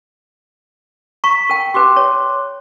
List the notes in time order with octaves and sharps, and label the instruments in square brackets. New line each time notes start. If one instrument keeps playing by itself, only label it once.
[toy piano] A#5 C#6 [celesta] B6
[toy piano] A#4 G5
[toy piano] G4 B4 G5 [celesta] C6 D6 F#6
[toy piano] C#5